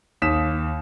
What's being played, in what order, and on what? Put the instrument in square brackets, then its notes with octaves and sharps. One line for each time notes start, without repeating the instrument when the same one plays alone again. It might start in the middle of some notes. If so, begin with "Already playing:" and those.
[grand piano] D#2 D#6 B6 E7